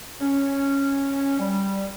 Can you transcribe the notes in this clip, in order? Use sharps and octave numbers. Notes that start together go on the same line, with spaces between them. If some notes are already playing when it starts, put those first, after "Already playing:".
C#4
G3